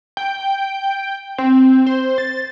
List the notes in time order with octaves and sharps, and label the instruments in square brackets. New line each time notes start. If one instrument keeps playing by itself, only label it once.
[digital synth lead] G5
C4
C5
A6